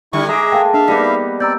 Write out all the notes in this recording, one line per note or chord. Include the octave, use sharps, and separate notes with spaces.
D3 G3 E4 C#6
G#3 G#4 D#5 E5 A#5 D6
A#3 A4 F5 G5
D4 E5 F5 A5
G3 A#3 B3 D#4 B6
C4 D5 A#5 E6 G6